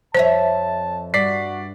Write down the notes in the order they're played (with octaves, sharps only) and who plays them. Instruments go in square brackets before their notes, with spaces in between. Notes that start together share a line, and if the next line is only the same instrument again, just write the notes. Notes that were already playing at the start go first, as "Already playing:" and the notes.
[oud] F2 C#5 E5 [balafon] C5 [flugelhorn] A5
[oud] G2 [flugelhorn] F#4 [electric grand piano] D5 B6 C7